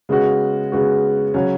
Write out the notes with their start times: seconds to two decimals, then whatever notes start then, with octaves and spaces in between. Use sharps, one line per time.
0.09 C#3 G#3 B3 F#4
0.72 C#3 G#3 B3 F#4
1.34 C#3 F#3 C#4